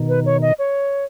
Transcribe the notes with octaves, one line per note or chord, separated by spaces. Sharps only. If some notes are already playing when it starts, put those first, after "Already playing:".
Already playing: B2 D#3
B4
C#5
D#5
C#5